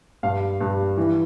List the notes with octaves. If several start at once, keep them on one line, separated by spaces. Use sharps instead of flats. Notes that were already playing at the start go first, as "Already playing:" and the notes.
G2 F5
G2
E3